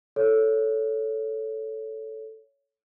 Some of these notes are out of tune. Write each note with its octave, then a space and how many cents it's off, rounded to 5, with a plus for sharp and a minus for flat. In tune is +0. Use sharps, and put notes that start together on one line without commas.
A4 +0 C#5 +10